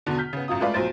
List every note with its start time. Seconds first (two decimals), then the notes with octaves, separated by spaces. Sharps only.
0.06 E2 B2 D3
0.18 F6 G6 B6
0.33 C#3 B3
0.48 A1 F#2 F4 D#6
0.61 G#3 A3 F4 B4 D5 F5
0.74 B1 F3 F#3 C5 A6 D7